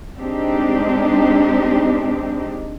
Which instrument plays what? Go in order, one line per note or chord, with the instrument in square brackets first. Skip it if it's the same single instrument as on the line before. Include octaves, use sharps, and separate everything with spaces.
[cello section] G#3 C4 D4 D#4 G4